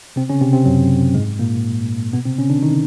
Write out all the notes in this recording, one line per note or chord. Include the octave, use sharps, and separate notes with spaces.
C3 C4
C#3 C#4
C3 C4
C3 C4
F#2 F#3
G#2 G#3
A#2 A#3
B2 B3
C3 C4
C#3 C#4
D3 D4
D#3 D#4